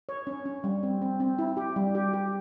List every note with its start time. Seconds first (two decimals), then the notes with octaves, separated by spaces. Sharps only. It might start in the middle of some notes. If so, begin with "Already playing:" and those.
0.09 C#5
0.27 C#4
0.45 C#4
0.64 G3
0.83 C4
1.02 C4
1.20 C4
1.39 E4
1.57 G4
1.76 G3
1.95 G4
2.13 G4